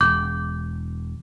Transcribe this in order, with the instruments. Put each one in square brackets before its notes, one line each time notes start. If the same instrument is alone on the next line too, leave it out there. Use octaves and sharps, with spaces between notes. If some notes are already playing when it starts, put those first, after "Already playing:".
[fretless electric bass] E1 [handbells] D6 G6